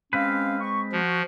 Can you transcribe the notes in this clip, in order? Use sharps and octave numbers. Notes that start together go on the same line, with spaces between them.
G#3 C4 C#4 B4 F5
C#6
F3 F#4